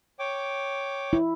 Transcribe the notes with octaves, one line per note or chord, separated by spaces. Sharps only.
C#5 G5 D6
E4